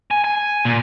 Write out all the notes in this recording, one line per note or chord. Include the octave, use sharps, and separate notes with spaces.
G#5
G#5
A#2